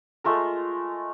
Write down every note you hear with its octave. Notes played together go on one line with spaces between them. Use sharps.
G#3 A3 F4 A#4